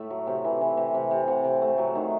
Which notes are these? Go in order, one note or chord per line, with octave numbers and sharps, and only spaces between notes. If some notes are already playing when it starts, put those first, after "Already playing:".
Already playing: A2 A3 E5
F#3
C3
E3
E3
C3
C3
C3
C3 F#5
C3
A3
F#3
D#3